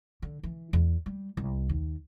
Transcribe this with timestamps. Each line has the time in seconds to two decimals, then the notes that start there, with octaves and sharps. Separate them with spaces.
0.22 D3
0.43 E3
0.73 E2
1.06 G3
1.37 C2
1.69 D#2